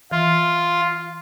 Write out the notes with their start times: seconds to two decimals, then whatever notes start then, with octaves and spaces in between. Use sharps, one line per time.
0.11 E3 F4